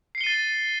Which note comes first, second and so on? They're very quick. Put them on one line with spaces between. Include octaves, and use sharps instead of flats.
C7 C#7 G7 D#7 A6